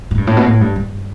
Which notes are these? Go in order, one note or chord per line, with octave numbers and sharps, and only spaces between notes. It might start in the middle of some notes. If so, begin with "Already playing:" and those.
A2
G2
A2
B2
A2
G2
G2